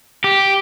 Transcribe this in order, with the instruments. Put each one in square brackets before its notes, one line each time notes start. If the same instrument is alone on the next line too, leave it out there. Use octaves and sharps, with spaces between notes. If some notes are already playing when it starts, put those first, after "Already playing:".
[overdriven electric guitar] G4